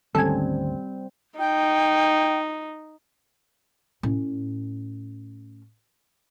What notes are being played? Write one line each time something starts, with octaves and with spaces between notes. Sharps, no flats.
D2 G#2 D#3 G3 C4 C#4 A4 G#5
D#4 G5
A2 C#4